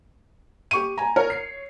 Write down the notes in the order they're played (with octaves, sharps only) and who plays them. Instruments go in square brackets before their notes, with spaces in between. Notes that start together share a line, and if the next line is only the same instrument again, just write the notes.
[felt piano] G4 C#6 D#7
G#5 A#5
[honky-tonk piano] A#4 [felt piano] C#5
[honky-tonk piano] C7